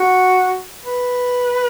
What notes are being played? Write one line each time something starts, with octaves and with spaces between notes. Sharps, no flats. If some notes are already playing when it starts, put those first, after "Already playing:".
Already playing: F#4
B4